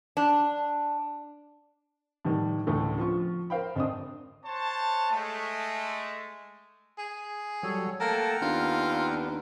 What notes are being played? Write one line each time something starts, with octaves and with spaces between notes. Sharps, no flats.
D4
A2 D#3 E3 G3
D2 A2 C#3 E3 A3
F3 F4 C#6
A#4 C5 F5 G5 B5
G#1 C4 D4 D#6
C5 C#5 F#5 A5
G#3 A3
G#4
F#3 G3 A4 C#5
A3 A#3 A4 F#5 G5 A5 A#5
D#2 B3 D4 F4